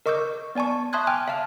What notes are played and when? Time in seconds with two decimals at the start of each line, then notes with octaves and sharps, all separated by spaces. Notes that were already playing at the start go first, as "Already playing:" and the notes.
0.06 A#4 D#5 C#6 D6 E6 G6
0.55 B3 D5 G#5 A5 C#6
0.93 E5 A5 C6 D#6 F#6 G#6
1.07 G5 G#5 D6 F6
1.28 E5 F5 A5 F6